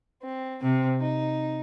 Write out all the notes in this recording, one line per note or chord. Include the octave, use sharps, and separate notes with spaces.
C4
C3 C4
D#4